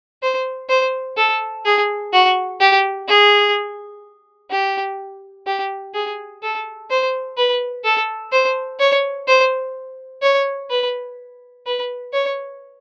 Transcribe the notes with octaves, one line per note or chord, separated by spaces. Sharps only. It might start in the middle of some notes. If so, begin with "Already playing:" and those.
C5
C5
A4
G#4
F#4
G4
G#4
G4
G4
G#4
A4
C5
B4
A4
C5
C#5
C5
C#5
B4
B4
C#5